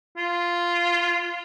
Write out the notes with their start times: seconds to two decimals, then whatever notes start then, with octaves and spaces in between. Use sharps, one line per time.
0.17 F4